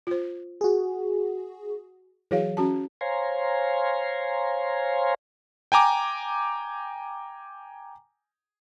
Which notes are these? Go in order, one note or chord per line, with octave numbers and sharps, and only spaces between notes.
F4 C5
F#4 G#4
E3 F#3 G#4 C#5 F5
C#4 F#4 A5
C5 C#5 F5 G#5 A#5 C6
G5 G#5 A#5 D6